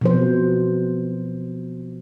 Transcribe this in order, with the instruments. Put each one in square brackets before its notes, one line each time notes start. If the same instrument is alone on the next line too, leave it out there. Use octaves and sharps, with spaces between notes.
[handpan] B2 F3 C5